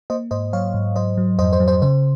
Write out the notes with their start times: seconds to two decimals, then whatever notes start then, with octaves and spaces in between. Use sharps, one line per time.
0.10 A#3 C5 D#5
0.31 G#2 C5 D#5
0.53 F#3 C#5 F5
0.74 G#2
0.96 F#3 C5 D#5
1.17 F#3
1.39 F2 C5 D#5
1.53 C5
1.60 F#3
1.68 C5
1.82 C#3 C5